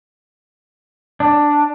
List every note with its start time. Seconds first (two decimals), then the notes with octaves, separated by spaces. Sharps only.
1.20 D4